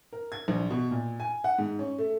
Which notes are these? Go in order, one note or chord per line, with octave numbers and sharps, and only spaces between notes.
A#4
G#6
A#1
B2
A#2
G#5
F#5
G#2
C#4
A3